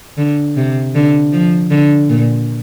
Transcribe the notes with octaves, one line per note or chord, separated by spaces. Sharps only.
D3
C3
D3
F3
D3
A#2